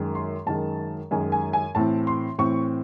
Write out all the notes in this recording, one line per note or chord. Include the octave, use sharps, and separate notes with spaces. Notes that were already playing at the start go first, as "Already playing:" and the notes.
Already playing: F#2 D#3 G#3
C6
F#2 D#3 G#3 A5
F#2 D#3 G#3 G#5
G#5
G#5
A2 E3 C4 A5
C6
A2 E3 C4 C#6